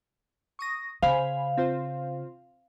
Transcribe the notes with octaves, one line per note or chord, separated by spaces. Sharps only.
C#6 D#6 A#6
C#3 C5 F5 G#5 B5
C4 F4 C5